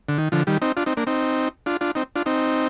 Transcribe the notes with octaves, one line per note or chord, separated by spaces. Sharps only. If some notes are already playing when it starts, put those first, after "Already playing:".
D3
D#3
D3 F3
D#3 G3
C4 D#4
D4 F4
C4 D#4
A#3 D4
C4 D#4
D4 F4
D4 F4
C4 D#4
D4 F4
C4 D#4